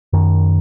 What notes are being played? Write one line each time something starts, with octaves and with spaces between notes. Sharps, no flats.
F#2 D#3